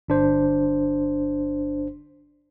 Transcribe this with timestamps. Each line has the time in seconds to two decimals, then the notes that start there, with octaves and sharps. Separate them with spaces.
0.08 G1 D4 C5